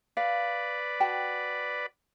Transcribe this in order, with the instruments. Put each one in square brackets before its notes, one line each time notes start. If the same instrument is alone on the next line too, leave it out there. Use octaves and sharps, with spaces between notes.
[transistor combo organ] B4 D5 [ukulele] F5
[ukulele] F#4 G5 A5